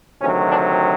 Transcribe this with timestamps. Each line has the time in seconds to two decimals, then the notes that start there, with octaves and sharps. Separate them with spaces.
0.21 D2 C3 D#3 F#3 C#4
0.49 D4